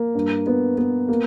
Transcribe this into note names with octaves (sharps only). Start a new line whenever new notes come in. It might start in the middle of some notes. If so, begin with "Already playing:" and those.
Already playing: A#3
G2
B3
B3
A#3